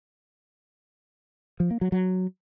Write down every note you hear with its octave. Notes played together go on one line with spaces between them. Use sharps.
F3
A#3
F#3
F#3